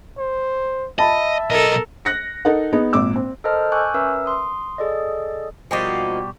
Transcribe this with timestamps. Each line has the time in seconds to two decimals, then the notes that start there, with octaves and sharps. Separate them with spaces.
0.18 C5
0.99 D#5 E5 A5 B5
1.50 B1 A4 A#4 D#5
2.05 F#6 A#6 C#7
2.45 D#4 A4 A#4 F#5
2.73 B3 D#4 G#4
2.93 G#1 A#2 D6 E6
3.16 C4
3.44 A4 A#4 C5 D#5 A5 F6
3.72 G#5 C#6 D6 E6 F#6 G6
3.94 C#4 A#4 B4 E5 E6
4.26 C6 D#6
4.78 G#4 A4 D5 D#5
5.71 B2 F3 G3 A#3 D#4 F#4 G4